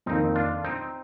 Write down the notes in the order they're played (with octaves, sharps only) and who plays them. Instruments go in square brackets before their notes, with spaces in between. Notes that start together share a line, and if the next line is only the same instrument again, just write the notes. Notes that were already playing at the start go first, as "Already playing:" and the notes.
[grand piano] F2 D#3 A#3 [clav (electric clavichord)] C4 D#4
[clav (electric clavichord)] D4 F4
C4 D#4